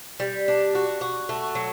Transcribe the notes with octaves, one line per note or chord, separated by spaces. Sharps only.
G3
D4
F#4
F#4
A3
F#3